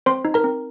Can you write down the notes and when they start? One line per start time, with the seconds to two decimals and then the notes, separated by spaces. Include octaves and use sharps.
0.06 C4 C5 C6
0.25 D#4
0.34 A#4 A#5
0.44 C4